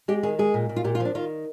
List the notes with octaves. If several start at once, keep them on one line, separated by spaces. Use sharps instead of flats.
G#3 G4
D#3 G#4
G#3 G#4
A#2
A#2
F4
A#2 G4
F4
F3
D4
D#3 F4